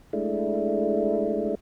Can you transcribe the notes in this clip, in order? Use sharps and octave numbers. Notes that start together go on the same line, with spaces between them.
G#3 A3 D4 E4